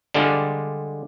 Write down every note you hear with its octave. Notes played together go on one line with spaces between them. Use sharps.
D3 G3 G#3 D4 F4 D5